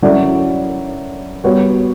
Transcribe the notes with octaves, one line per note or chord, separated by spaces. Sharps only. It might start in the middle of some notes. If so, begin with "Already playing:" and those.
F#3 C#4 E4 A4 D5
G3 B3 F#4 C#5